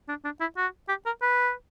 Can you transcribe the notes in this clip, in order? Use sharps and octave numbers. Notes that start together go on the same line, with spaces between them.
D4
D4
E4
F#4
G4
A#4
B4